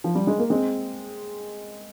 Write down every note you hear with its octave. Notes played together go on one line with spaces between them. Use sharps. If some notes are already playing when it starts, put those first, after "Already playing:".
F3
G3
G#3
A#3
G#3 C4